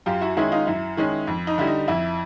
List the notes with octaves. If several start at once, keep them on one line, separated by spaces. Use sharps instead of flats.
F#2 F4 G4
E4 F#4
D#3 G#3 C#4 E4
D#4 F4
F#2 E4
D#3 G#3 C#4
F2
D#4
D3 G3 E4
D#4
F2 E4